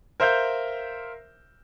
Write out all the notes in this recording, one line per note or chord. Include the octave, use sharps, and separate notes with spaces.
A#4 C5 E5 F5 G6